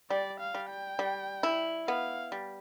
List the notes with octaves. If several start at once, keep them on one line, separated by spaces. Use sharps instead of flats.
G3 D5
F5
G3
G5
G3
E4
B3 F5
G3